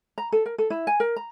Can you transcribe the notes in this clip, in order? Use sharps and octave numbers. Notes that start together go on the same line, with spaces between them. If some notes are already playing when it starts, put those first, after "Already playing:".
A#5
A4
A#4
A4
E4
G#5
A#4
A#5